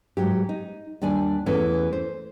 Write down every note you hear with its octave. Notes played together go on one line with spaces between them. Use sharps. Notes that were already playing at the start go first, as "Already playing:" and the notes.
G#2 F#3 G4
D#4
D#2 G3 D4 D5 G#5
E2 E3 A3 C#4
C5